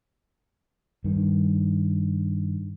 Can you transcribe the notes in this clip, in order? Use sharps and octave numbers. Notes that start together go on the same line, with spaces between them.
G2 D#3